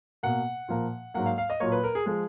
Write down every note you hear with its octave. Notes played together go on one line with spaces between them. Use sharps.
B2 A#3 F#5
A#2 F3 A#3
G#2 F#3 A#3 F#5
F5
F5
D#5
A#2 F#3 A#3 C#5
B4
A#4
G#4
F3 G#3 G#4